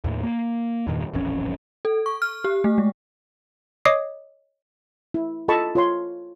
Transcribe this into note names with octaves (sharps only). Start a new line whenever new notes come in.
D#2 A2
A#3
E2 G2 A#2 D#3
D#1 A1 F2 C#4
A4
C#6
F6
G4
A3
G#3
C#5 D#5 D6 D#6 C7
E4
F4 A4 D#5 A5 B5 C#6
F4 C#5 C6